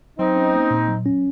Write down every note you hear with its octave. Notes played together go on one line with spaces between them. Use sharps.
F#3 C4 D#4
C#4
A#3
A#2
F#3
C#4